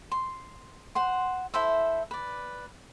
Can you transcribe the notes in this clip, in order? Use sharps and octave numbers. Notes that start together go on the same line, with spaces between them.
C6
C5 F#5 C6
E4 A4 C5 E5
B4 D5